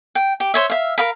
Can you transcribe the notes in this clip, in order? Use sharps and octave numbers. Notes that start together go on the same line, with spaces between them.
G5
G4
C5 C#5 E5
E5 F5
A#4 F5 B5